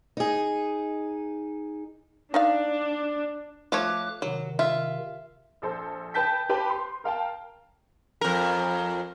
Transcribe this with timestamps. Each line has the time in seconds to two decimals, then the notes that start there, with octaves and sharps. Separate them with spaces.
0.17 D#4 G#4
2.34 D4 D#4 D5 F5
3.72 F3 A3 C#5 D6 F#6
4.22 C3 D#3 F#3
4.59 F4 E5
5.62 A#1 A4 C5
6.14 B4 G5 A5 G6 B6
6.49 G4 B4 C5 A5 B5
6.70 C6
7.04 A#4 F5 G5 A5
8.21 F2 A#4